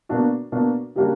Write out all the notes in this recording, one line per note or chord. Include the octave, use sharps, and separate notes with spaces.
B2 A#3 D4 F#4
B2 A#3 D4 F#4
C#3 G3 A#3 D4 F#4